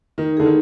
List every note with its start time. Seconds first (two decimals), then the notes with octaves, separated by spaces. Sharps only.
0.18 D#3 D#4
0.37 D3 G#4
0.46 D#3